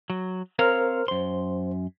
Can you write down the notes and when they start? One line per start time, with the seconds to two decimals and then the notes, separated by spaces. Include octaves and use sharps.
0.10 F#3
0.59 C4 A#4 C5 C#5 F5 F6
1.08 F#2 C5 C6